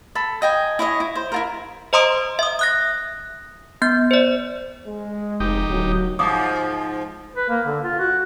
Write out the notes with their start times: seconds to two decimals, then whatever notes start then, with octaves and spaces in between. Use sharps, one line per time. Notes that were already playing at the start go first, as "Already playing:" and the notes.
0.15 A4 B5
0.42 D#5 G5 G#5
0.79 E4 C#5 D#5
1.00 E4
1.15 C5
1.32 E4 F4 A#4
1.93 C5 D#5 A#5 C6 D#6 D7
2.39 E5 D#6
2.59 D#6 F#6 A#6
3.82 B3 G6
4.11 C5 D5
4.87 G#3
5.40 F1 D#4 G4
5.70 D1 F#3
6.19 G#2 B2 F3 F5 D6 D#6
7.35 B4
7.49 A#3
7.66 D3
7.84 F4
7.99 F#4